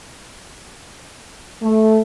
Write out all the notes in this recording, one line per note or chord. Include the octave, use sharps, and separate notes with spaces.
A3